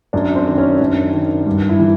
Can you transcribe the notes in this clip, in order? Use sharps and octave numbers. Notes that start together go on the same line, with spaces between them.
F#2 D4
C4
D#3
C#4
F#2 D4
D#3
G2
E4
E3